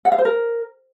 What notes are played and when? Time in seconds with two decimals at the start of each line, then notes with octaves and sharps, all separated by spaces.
0.05 F#5
0.12 F5
0.18 C5
0.25 A#4